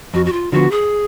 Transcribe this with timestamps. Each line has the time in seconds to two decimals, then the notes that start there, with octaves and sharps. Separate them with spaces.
0.14 F2 F#4
0.25 F#4
0.32 F4
0.52 D3 F3 B3 F#4
0.71 G#4